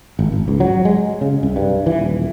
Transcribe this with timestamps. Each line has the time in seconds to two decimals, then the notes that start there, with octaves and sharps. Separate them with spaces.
0.19 G#1
0.32 G#1
0.48 C#2
0.60 F#3
0.85 G#3
1.21 C#3
1.43 C2
1.56 G2
1.86 E3
1.99 D#1